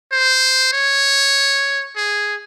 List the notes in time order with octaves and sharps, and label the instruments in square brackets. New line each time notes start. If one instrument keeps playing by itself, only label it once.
[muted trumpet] C5
C#5
G#4